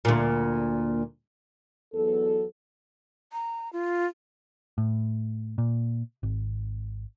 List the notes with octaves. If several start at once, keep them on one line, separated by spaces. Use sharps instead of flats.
D2 A#2
E2 F#3 B3 A4
A#5
F4
A2
A#2
G#1